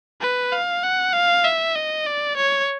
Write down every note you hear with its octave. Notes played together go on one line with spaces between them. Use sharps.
B4
F5
F#5
F5
E5
D#5
D5
C#5